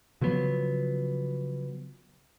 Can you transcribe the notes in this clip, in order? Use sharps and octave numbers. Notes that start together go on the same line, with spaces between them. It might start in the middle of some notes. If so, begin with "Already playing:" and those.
C#3 F3 F#3 B3